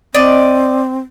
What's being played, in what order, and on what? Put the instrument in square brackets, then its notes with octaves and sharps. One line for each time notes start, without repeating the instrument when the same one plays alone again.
[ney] C4 [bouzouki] D5 D#5